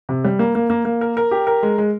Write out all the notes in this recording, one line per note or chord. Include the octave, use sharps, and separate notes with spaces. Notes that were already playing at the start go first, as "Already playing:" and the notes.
C3
G3
A#3
A#3
A#3
A#3
A#4
A#4
G4
A#4
G#3
G#3